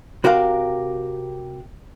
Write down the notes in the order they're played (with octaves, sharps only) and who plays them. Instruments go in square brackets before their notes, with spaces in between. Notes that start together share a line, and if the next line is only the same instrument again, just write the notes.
[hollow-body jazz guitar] C3 F#4 G4 A#4 F5